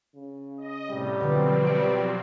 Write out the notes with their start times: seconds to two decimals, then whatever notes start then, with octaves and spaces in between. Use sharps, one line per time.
0.15 C#3
0.58 D#5
0.90 A2 C3 G3
1.21 B2 D3 F3 F#3 C4 B4
1.67 G3 C#7 D7